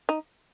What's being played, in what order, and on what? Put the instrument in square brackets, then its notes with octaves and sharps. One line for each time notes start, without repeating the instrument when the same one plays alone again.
[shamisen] D#4